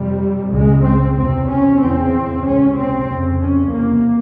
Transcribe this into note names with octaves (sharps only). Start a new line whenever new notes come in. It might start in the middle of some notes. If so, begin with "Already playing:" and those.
Already playing: F2 C3 G3
C#2 C#3 G#3
C4
E2 C3 C4
C#4
E2 C#3 C4
C#2 C3 C#4
C4
F2 C#3
C#4
E2 C3 A#3